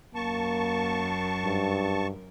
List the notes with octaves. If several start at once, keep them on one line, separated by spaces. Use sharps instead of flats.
F#2 A#3 A#4 A5 C#6
G2